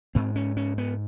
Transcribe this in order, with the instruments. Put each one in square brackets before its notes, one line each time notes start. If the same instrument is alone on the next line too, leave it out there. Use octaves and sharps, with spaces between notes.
[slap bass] G#2 C4
C#4
C#4
B3